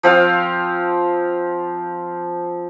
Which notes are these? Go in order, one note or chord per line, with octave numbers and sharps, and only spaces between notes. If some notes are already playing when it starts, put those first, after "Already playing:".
F3 C4 F4 F5